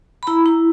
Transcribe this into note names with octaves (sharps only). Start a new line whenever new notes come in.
B5
E4 A#5
E4